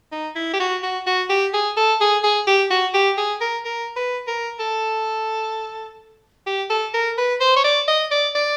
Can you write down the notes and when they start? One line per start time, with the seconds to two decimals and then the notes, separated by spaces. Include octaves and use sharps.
0.12 D#4
0.35 E4
0.53 G4
0.60 F#4
0.83 F#4
1.06 F#4
1.29 G4
1.54 G#4
1.77 A4
2.01 G#4
2.23 G#4
2.47 G4
2.70 F#4
2.94 G4
3.18 G#4
3.41 A#4
3.65 A#4
3.96 B4
4.27 A#4
4.59 A4
6.47 G4
6.70 A4
6.94 A#4
7.18 B4
7.40 C5
7.56 C#5
7.64 D5
7.88 D#5
8.11 D5
8.35 D5